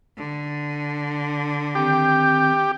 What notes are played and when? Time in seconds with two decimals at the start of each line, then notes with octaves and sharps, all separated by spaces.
0.17 D3
1.75 D#3 C4 G4 G6